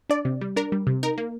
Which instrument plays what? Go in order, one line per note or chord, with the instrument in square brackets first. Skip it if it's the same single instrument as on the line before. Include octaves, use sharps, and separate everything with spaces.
[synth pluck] D4 D5
C3
G3
D4 A#4
G3
C3
D#4 A#4
A#3